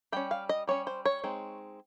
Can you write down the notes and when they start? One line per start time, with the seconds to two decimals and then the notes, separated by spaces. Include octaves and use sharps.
0.12 G3 C#4 G5
0.31 F5
0.49 D#5
0.67 G3 C#4 C#5
0.87 C5
1.05 C#5
1.24 G#3 C4 D#4